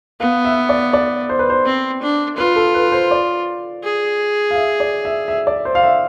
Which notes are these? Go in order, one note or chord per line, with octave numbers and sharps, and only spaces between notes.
B3 F5
E5
D5
D5
C5
B4
C5
C4
D4
F4 B4
A4
B4
C5
D5
G#4
F5
E5
D5
E5
E5
D5
C5
F5
E5